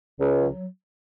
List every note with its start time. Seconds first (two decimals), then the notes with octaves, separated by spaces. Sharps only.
0.20 C#2
0.38 F#3